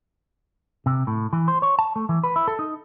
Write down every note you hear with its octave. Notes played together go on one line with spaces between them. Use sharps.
C3
A2
E3
C5
C#5
A5
A3
E3
B4
E4
A4
D#4